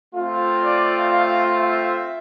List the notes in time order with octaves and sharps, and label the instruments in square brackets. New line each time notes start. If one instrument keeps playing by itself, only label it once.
[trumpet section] A3 C4 F4
D5
F5
E5